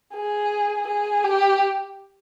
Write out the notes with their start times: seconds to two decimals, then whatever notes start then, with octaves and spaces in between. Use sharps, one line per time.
0.14 G#4
0.88 G#4
1.24 G4